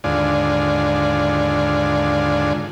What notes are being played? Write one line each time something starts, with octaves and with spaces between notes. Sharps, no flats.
D#2 G#2 D3 F4 D5 G#5